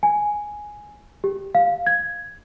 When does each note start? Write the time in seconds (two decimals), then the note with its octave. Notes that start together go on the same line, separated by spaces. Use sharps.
0.03 G#5
1.24 G4
1.55 F5
1.87 G#6